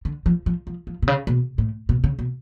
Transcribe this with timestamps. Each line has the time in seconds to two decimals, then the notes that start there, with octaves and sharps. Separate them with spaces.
0.05 D3
0.26 F3
0.46 F3
0.67 F3
0.87 F3
1.02 B2
1.08 C#3
1.27 B2
1.58 A2
1.89 B2
2.04 C#3
2.19 B2